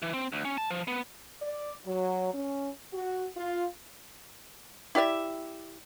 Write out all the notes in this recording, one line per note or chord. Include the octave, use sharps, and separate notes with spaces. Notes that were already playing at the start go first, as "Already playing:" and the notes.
E3
C4
D2
C#4
A5
F3
B3
D5
F#3
C#4
F#4
F4
E4 G4 D5 E5